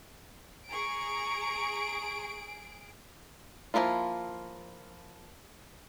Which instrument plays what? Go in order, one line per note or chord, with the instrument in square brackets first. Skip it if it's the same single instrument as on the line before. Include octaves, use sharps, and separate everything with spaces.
[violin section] G#4 D7 [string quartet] A#5 C#6
[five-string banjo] F3 G3 A#3 E4 F4